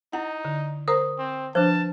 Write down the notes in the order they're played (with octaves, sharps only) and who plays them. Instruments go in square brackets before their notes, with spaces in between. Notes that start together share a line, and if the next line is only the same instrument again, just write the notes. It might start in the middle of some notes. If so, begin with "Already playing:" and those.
[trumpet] D#4 [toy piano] E4 [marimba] F#5
[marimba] D3
[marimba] A#4 C5 A#5 [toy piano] D#6
[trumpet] C4
[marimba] F3 D4 [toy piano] B4 C5 [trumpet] A5